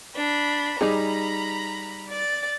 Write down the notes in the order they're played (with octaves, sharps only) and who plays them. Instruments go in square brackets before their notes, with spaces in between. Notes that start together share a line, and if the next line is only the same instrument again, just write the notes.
[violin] D4 B5
[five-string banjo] G3 D#4 G#4 [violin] A#5 B5
[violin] D5 A6